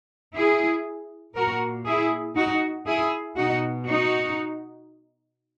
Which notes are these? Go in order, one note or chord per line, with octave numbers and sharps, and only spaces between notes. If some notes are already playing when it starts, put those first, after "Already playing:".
E4 G#4
A#2 F#4 A#4
E4 G#4
D#4 F#4
E4 G#4
B2 D#4 F#4
D#4 F#4